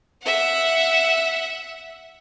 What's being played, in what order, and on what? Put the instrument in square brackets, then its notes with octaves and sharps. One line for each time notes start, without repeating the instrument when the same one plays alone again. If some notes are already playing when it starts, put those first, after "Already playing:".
[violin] E5 F#5